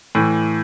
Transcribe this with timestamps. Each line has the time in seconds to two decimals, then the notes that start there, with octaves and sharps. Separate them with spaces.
0.15 A2 E3